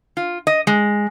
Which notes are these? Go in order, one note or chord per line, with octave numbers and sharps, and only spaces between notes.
F4
D#5
G#3